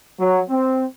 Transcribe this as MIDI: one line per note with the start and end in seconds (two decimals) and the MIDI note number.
0.19 0.41 54
0.50 0.84 60